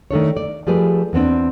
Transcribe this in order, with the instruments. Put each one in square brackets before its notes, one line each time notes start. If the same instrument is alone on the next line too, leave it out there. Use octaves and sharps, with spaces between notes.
[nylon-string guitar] D#3 A3 D4 C#5
D5
F3 A3 G4 G#4 B4 D5
E2 B3 C4 D4